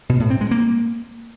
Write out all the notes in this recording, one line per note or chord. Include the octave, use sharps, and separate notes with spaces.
B2
A2
C4
G#3
A#3